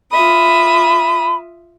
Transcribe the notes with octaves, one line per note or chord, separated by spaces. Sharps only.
F4 E5 B5 D#6